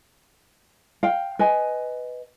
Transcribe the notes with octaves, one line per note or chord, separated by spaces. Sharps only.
F5 G5
B4 D#5 G#5